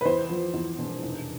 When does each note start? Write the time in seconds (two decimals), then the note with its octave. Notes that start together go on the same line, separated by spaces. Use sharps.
0.01 B4
0.05 E2 C5
0.29 F3
0.54 E2
0.78 E1
1.03 F1